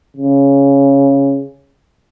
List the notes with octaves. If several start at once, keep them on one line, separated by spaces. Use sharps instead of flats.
C#3